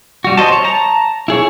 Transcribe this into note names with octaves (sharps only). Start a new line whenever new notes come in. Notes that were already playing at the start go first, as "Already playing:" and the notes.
G3 F#4
C5 D#5 A5
C#5
A5 A#5
E4 G#4 C#5